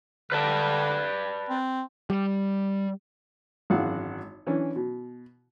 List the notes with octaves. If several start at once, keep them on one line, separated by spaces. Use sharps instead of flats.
D3 B4 D5 A5
C4
G3
G#1 F#2 E3 F#4 F5 F#5
E3 C#4 D4
B2